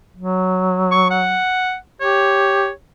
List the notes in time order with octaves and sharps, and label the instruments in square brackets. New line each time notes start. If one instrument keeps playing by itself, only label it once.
[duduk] F#3
[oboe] C#6
F#5
[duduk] G4 [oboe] C#5